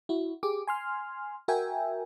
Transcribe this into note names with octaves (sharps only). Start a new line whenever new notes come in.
E4 F#4
G4 G#4 D6
G#5 C6 F6
F#4 A#4 E5 G5 G#5